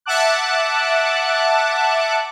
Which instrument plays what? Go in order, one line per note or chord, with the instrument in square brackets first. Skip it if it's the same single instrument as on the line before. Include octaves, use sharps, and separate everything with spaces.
[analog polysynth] E5 F#5 A5 D6 F#6